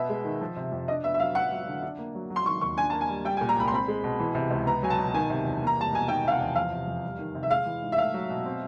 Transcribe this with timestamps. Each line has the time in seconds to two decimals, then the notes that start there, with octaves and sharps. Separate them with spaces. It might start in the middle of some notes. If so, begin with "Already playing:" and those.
Already playing: B2 B3 E5
0.09 G#3
0.25 D#3
0.41 F3
0.57 C3
0.72 F2
0.88 D4 D#5
1.04 B3 E5
1.14 E5
1.20 F#3 F5
1.35 B3 F#5
1.52 F#3
1.68 D3
1.83 D4
1.99 A#3
2.15 F#3
2.30 F#3
2.36 C6
2.46 D#3 C#6
2.61 D#2 C#6
2.77 D4 G#5
2.90 A#3 A5
3.01 G#5
3.09 G3
3.25 G3 G5
3.37 G#5
3.41 A#2
3.49 A#5
3.56 C2 B5
3.68 C6
3.72 C4 B5
3.88 G#3
4.04 B2
4.20 E3
4.35 C3
4.51 C#2
4.67 B3 A#5
4.83 F#3 G#5
4.90 A5
4.98 B2
5.14 D#3 G#5
5.30 C3
5.45 E2
5.61 A#3
5.67 A#5
5.77 G3 A5
5.93 B2 G#5
6.08 D#3 G5
6.24 C3 F5
6.32 F#5
6.41 E2
6.55 F3 F5
6.72 C3
6.88 F2
7.04 G3
7.19 D#3
7.35 C3
7.43 E5
7.50 G#3 F5
7.66 E3
7.83 G#2
7.92 E5
7.98 A3 F5
8.14 F#3
8.30 B2
8.45 C4